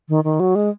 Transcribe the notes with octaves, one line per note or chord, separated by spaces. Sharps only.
D#3
D#3
F#3
G#3